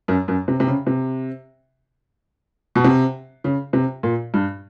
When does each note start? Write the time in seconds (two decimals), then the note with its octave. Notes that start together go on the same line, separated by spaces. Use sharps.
0.08 F#2
0.28 F#2
0.48 C3
0.60 C3
0.67 C#3
0.87 C3
2.75 B2
2.84 C3
3.44 C#3
3.73 C3
4.03 A#2
4.34 G2